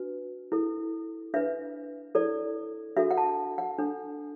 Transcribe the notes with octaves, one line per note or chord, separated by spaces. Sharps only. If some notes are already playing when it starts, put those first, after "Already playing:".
Already playing: D4 F#4 B4
E4 A4
D4 B4 E5
E4 A4 D5
D4 F#4 A4 E5
F#5
A5
F#5
D4 A4